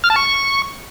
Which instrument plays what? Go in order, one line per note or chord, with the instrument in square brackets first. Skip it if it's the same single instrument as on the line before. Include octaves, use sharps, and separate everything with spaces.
[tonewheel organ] F6
A5
C#6